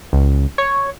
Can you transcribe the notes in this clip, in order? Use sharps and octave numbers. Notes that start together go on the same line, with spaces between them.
C#2
C#5